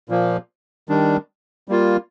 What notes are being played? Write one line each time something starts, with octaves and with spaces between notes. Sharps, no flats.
A#2 F3 A#3
D#3 G3 D4
G3 A#3 F4